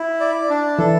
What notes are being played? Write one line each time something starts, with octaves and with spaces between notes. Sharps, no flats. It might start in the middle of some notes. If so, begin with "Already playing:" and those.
Already playing: E4
D5
D4
E3 A4